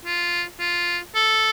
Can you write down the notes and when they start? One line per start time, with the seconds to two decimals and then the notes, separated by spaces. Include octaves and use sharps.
0.05 F4
0.60 F4
1.15 A4